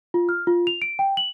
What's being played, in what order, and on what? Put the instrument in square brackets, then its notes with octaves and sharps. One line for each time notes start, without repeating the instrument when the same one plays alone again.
[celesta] F4
F6
F4
F7
D7
G5
F#7